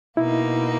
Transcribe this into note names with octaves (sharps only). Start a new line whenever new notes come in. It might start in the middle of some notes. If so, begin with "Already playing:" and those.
B2 A#3 D#4 E4